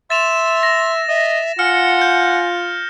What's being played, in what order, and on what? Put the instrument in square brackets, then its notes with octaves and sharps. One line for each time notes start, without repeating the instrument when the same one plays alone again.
[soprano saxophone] E5 [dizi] C6 [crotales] A6 E7 F7
[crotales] A#6
[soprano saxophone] D#5 [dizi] E5
[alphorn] F4 [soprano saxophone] F#5 [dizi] G#5 [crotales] F6 C#7
[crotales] G6